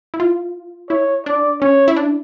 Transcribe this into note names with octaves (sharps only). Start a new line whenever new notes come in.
E4
F4
E4 C#5
D4 D5
C#4 C#5
E4
D4